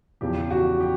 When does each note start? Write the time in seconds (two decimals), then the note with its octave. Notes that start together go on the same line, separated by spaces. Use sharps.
0.21 E2 C#3 F3 G4
0.51 F#4
0.80 G4